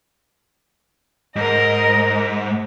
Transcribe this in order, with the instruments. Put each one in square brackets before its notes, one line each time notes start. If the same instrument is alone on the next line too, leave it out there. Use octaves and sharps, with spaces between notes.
[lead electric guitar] G#2 [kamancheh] A#4 D#5